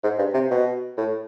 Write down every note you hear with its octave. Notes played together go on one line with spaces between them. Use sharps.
G#2
G2
C3
B2
A2